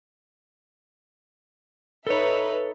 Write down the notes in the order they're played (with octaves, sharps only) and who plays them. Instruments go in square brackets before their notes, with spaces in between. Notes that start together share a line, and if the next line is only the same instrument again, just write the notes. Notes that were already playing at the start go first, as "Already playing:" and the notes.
[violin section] D#4 B4 E5 [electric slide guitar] A4 C#5